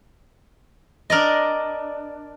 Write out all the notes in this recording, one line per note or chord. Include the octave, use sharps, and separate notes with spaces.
D4 A#4 D5 D#5